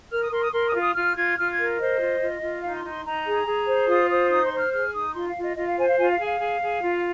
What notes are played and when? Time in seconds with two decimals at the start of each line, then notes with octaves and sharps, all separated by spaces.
0.10 A#4 F6
0.21 D#6
0.31 A#4 C6
0.41 D#6
0.52 A#4 C6
0.66 D#6
0.73 F4
0.80 D#6
0.94 F4 F6
1.15 F4 G#6
1.36 F4 F6
1.50 G#6
1.57 A#4
1.78 C5 D#5
1.99 F4
2.20 F4
2.41 F4
2.62 D#4 F5
2.76 C6
2.83 D#4
2.90 C6
3.04 D#4 A#5
3.25 G#4
3.45 G#4
3.66 C5
3.88 F4 D#6
4.09 C5 D#6
4.30 D#4 D#6
4.44 C6
4.51 C5
4.58 F6
4.72 G#4 F6
4.92 D#4 D#6
5.14 F4 C6
5.27 F5
5.35 F4
5.42 D#5
5.56 F4 D#5
5.66 F5
5.77 C5 G#5
5.87 F5
5.97 F4 G#5
6.12 F5
6.19 G#4
6.25 F5
6.39 G#4
6.61 G#4
6.81 F4